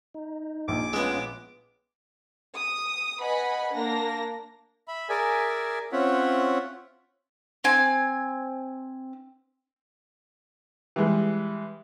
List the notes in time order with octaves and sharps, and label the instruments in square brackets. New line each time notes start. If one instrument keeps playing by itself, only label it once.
[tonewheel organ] D#4
[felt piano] A#1 [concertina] D6
[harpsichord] G#3 B3 [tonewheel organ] C#4 F4
[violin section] D#6
B4 D#5 F#5 G#5 B5
A#3 D4 A#6
[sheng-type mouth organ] E5 B5
G#4 A#4 D5 E5 G#5
C4 C#4 F4 C#5 E5 F#5
[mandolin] C4 G#5
[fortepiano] E3 G3 G#3